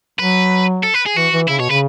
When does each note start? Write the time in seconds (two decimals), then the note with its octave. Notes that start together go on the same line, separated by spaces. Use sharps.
0.19 F#3 B4
0.83 A4
0.94 B4
1.06 G#4
1.16 E3 F#4
1.33 E3
1.48 C#3 E4
1.59 B2 C#5
1.70 C#3 B4